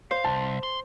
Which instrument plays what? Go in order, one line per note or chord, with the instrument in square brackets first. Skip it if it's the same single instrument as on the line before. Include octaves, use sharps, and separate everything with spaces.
[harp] C5 [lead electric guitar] F5
[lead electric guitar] C2 [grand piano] A5
[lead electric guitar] C6